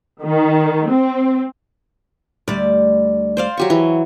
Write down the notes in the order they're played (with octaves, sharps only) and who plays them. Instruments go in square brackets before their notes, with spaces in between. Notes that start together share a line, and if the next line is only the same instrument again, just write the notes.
[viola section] D#3
C4
[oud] D2 G3 [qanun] D5
[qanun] C5 D5 F5
F#3 G4 C#6
E3 F#3